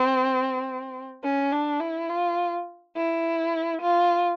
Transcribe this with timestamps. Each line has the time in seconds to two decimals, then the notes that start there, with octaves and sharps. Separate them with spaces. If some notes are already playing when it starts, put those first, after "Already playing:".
Already playing: C4
1.23 C#4
1.52 D4
1.80 E4
2.09 F4
2.96 E4
3.82 F4